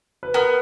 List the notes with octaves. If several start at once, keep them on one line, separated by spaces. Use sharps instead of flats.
B4
B3 A#4